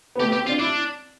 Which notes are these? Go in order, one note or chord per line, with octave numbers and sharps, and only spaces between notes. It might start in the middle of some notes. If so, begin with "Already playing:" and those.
B3
A3 G4
B3
G4
C4
D4 F4
D4 E4